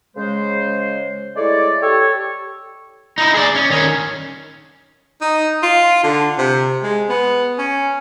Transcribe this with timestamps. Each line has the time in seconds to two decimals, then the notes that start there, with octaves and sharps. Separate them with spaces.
0.17 C#3 G#3 C5
1.36 G#3 A3 E4 C#5 D5
1.82 G4 A4 C#5
3.18 D#4 E4
3.34 G#4 D5
3.55 C#4
3.70 D#3 C#4
5.21 D#4
5.63 F4
6.04 D3
6.38 C3
6.83 G#3
7.09 B3
7.58 C#4